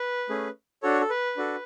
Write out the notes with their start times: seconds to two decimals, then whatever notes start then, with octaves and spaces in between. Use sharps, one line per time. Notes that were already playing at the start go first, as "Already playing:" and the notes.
Already playing: B4
0.29 A3 C#4 G#4
0.83 D4 F#4 A4 C#5
1.01 A4
1.10 B4
1.37 D4 F#4 A4